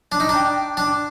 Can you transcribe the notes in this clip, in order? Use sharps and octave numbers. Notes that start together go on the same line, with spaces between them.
D4
D#4
D4 G5
D4